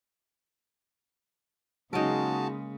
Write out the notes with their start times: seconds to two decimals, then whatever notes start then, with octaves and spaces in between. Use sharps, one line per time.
1.93 C#3 F#3 G#3 A#3 D#4 F#4 A#4 A5